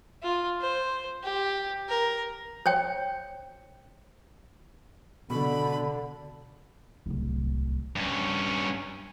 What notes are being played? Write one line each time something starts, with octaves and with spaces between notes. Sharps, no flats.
F4
C5
G4
A#4
C5 C#5 G5
B2 D3 B5
D1 C2
G2 C#4